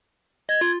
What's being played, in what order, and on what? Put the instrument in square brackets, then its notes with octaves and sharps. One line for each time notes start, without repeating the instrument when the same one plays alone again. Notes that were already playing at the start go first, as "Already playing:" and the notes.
[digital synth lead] D#5 [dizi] G#6
[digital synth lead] F4